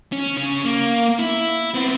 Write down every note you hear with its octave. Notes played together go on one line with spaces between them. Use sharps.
C#4
C#3
A#3
E4
B3 C4